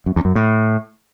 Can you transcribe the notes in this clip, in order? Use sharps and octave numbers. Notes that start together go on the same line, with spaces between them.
F#2
E2
F#2
A2